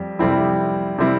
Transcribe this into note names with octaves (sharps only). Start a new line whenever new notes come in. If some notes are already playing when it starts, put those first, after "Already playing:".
Already playing: F2 G3
F2 C3 G3 C4 E4
C3 G3 C4 E4